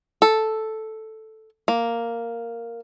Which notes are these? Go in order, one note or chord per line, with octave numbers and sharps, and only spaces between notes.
A4
A#3